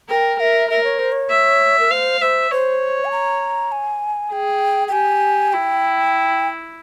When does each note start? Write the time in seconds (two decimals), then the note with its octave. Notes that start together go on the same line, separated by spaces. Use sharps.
0.09 A#4 G5
0.40 A#4 E5
0.70 A#4 E5
0.84 C#5
0.99 C5
1.12 C#5
1.30 E5
1.79 A#4
1.91 C5 F5
2.21 C5 E5
2.51 C5 C#5
3.05 G#5
3.11 A#5
3.72 G#5
4.32 G#4 G5
4.88 G5
4.92 G4 G#5
5.52 E4 G5